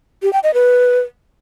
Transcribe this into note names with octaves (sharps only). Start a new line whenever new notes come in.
G4
G5
D#5
B4